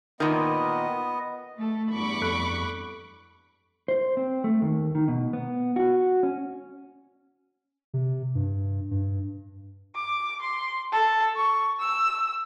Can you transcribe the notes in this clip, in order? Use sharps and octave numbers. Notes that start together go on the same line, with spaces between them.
A#2 D#3 B3 D#5
A3 A4
E2 G2 B5 C#6 D6
F2 A4 F#6
C5
C4
A3
D#2
D#3
B2
B3
F#4
C#4
C3
G2
G2
D6
C6
A4
C#6
E6